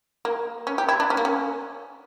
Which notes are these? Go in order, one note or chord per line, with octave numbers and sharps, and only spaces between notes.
A#3
C#4
G4
E4
D4
C#4
A#3
C#4